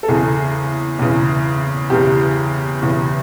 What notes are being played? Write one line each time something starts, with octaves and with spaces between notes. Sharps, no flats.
A4
E2 C#3 E3 G#4
E2 C#3 E3
E2 C#3 E3 G4
E2 C#3 E3